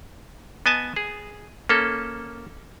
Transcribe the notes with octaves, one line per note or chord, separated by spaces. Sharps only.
B3 D#5 G#5 A5
G#4
A#3 C#4 A4